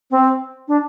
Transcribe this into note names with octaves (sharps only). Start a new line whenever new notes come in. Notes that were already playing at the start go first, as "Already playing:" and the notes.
C4
D4